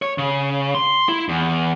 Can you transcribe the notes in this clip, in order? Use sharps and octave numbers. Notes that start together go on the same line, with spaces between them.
C#5
C#3
C6
E4
E2